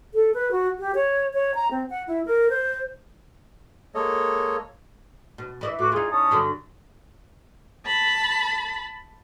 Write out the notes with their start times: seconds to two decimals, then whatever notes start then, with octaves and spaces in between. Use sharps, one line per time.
0.14 A4
0.34 B4
0.51 F#4
0.79 G4
0.95 C#5
1.33 C#5
1.54 A#5
1.71 C4
1.90 F#5
2.07 E4
2.26 A#4
2.50 C5
3.95 G#3 A#3 A4 C#5 D#5
5.38 B2
5.61 E3 D5 E5
5.79 A2 F#4 D6
5.92 E2 D#4 F4 G#4
6.11 C#4 A5 D#6
6.31 G2 D3 F#3
7.86 A5 B5